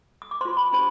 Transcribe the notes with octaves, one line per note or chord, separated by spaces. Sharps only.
D#6
D6
F4 C5 C6
B5
D4 G4 C5 B5